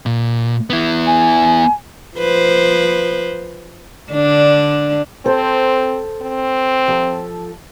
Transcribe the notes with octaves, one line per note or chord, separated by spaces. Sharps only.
A#2
B3 E4
G#5
F3 B4 C5
D3 D4
C4 A4 C5
C4
F3 A4